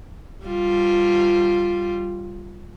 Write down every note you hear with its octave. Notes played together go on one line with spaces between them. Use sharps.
G3 F4